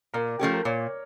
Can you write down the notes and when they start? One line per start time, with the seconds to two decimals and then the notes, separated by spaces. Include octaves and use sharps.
0.14 A#2 A#4
0.39 F3 A3 C#4 G4
0.53 A#4
0.65 A#2 C#5